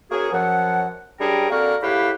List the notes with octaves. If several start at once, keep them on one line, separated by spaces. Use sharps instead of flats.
A#3 C#4 F#4 G#4
F#2 F3 F#5
F#2 G3 D4 G#4 A#4 G5
D3 A#3 C4 F#4 A#4 F6
C#2 A2 E4 G4 B4 F5